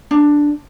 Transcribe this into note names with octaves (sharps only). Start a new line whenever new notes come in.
D4